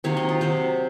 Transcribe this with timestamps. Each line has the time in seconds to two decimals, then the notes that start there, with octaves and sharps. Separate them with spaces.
0.04 C3 D#3 F#3 A#3 C#5
0.17 D#5
0.29 F4
0.41 C3 F#3 C4 C5